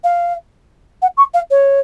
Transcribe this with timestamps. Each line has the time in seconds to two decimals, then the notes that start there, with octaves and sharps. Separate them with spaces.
0.04 F5
1.02 F#5
1.17 C#6
1.34 F5
1.51 C#5